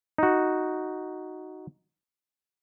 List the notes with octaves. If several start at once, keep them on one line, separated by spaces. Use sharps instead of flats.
D#4 F#4